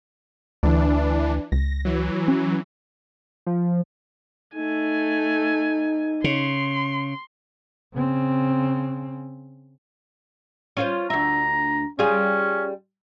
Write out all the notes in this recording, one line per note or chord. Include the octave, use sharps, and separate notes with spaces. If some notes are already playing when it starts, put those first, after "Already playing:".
D2 E3 D4
C#2 A#6
E3 F#3
C#4
F3
A3 D#4 G#5
C#3 C6
C#3 C4
C#4 F4 C5
D2 E5 A#5
G3 C#4 F4 G#4